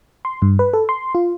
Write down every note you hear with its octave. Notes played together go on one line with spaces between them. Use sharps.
C6
G2
B4
A4
C6
F4